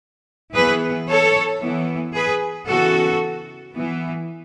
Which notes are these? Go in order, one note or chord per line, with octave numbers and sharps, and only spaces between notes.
E3 B3 G#4 B4
A4 C#5
E3 B3
G#4 B4
C#3 E3 B3 F#4 A4
E3 B3